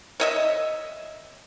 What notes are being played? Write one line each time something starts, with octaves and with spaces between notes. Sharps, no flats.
C#5 D#5 E5